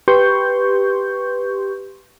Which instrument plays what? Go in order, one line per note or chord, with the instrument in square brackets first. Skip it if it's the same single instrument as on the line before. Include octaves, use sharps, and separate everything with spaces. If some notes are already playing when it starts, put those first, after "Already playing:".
[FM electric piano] G4 B4 C6 C#6 G6